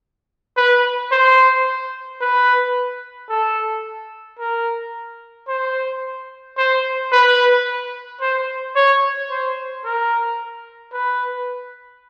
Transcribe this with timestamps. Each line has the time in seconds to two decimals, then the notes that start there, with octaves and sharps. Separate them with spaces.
0.57 B4
1.12 C5
2.21 B4
3.30 A4
4.39 A#4
5.48 C5
6.58 C5
7.13 B4
8.21 C5
8.76 C#5
9.30 C5
9.85 A#4
10.93 B4